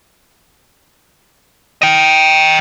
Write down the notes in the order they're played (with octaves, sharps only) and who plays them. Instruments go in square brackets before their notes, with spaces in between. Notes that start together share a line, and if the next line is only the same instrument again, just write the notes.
[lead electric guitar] D#5 G5